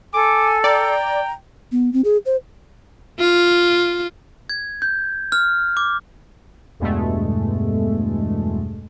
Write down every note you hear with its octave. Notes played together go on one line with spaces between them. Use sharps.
A4 G#5 D6
D5 G5 A#5
B3
C4
G#4
C5
F4
G#6
G6
F6
D6
E2 G2 B2 G#3 A3